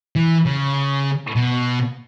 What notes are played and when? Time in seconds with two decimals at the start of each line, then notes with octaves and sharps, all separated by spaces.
0.16 E3
0.46 C#3
1.36 B2